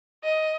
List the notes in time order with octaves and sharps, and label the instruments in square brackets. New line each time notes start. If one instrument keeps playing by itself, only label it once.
[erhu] D#5